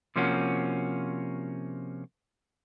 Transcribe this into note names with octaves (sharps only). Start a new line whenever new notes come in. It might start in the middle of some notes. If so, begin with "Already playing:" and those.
C3 F3 A#3 C#4 F#4